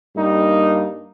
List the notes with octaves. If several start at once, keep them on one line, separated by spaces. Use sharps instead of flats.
G2 G3 A#3 D#4